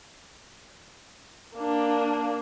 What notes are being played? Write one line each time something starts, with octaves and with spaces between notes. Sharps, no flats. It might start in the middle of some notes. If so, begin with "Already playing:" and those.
A#3 D4